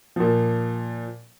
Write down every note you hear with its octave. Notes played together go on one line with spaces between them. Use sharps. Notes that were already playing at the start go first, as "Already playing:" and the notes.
A#2 F3